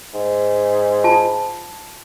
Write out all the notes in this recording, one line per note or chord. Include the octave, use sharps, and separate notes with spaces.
G#2
F4 A5